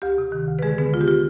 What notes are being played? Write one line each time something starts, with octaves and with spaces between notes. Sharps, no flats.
D2 G4
C3
D#3
D2
B4
D3 G#3 G#4
D3 B3 B4
D2 F4
G4
F4